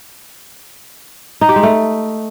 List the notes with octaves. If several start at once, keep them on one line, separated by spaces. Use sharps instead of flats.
D#4
G4
G#3
A3